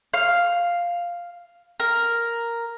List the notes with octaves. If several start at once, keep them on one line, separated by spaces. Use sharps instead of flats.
F5
A#4